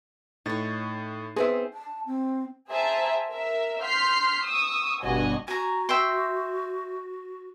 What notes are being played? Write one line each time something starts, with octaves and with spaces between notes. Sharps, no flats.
A2 D#4 C#5 A6
B3 C4 G#4 C5 E5
A5
C4
G#4 C5 E5 G5 A5 A#5
A#4 E5
C6 F6 G6 B6 C7
C#6 D#6 E6
G1 G2 B2 F#4 D#5 G#5
F#4 G#5 A#5
E5 G5 C6